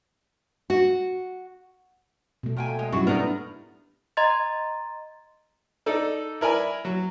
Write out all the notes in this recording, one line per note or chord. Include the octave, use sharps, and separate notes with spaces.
F#4
B2 A3
A#2 G5 G#5
G#3
F#2 G3 E4 F#4
B3 D4 D#4 A#4
D#5 A#5 C6 G#6 A6
D#4 A4 D5
E4 A#4 D5 G#5 B5
F#3